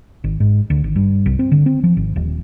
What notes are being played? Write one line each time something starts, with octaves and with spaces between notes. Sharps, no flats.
G#1
G#2
D2
G#1
G2
C2
C4
D3
C4
F3
G#1
D#1